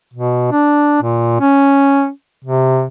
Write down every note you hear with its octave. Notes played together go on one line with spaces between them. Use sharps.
B2
D4
A#2
C#4
C3